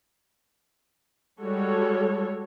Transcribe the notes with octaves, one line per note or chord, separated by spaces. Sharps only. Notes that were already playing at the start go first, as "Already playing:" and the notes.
G3 G#3 F#4 A4 C#5